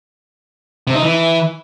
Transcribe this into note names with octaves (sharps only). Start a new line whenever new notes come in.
C3
D#4
E3